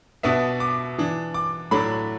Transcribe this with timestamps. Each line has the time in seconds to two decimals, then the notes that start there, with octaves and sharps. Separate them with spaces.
0.23 B2 B3 D4 E5
0.60 D6
0.98 E3 D4
1.34 D6
1.71 A2 F#3 A3 D4 B5